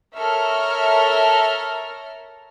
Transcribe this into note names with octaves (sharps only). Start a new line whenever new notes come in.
A4 A#4 C#5 E5 A#5 F6